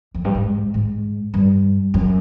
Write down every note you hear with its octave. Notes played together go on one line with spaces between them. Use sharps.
F2
G2
G#2
G#2
G2
F#2